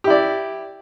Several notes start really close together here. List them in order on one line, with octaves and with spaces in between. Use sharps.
G4 E4 D5